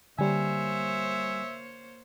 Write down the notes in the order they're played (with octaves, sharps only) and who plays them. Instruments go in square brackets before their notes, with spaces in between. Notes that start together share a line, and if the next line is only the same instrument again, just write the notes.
[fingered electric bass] D3 [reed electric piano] G3 G#5 [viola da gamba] A#3 C5 C#5 [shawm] E5